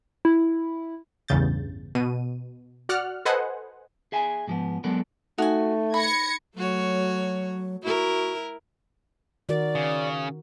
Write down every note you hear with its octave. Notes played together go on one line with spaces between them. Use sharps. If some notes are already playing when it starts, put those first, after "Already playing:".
E4
A1 E2 G2 C#3 G6 A6
B2 D#7
F#4 D5 F#5 F6 F#6
A4 B4 C5 D#5 F#5 G#5
G#4 E5 G#5
G#2 F3 B3
F#3 G#3 B3 D4 A4 A#4
A3 D#4 F#4 G#5
B5 G#6 A#6 C#7
F#3 A3 F#4 C#5
E4 F#4 A#4
D#3 F#4 A#4 D5
C#3